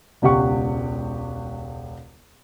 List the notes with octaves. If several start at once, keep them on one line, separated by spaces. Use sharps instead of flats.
E1 C#2 G4 F#5 C#6